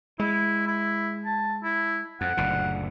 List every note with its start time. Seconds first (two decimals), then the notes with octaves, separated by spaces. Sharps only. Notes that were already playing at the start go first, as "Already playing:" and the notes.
0.19 G#3 E4
0.67 E4
1.25 A5
1.63 E4
2.21 F2 F#5
2.37 F#1 D2 A#2